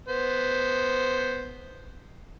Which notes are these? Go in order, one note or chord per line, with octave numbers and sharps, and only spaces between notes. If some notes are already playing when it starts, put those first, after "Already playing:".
B3 C5